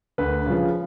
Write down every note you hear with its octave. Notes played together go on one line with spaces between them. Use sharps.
D2 B4
C#3 F3